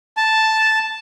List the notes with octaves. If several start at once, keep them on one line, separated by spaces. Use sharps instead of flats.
A5